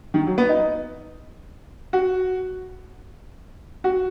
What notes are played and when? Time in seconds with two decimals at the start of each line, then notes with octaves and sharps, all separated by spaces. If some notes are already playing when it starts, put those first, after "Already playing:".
0.14 D#3
0.26 F#3
0.38 B3
0.49 D#4
1.93 F#4
3.84 F#4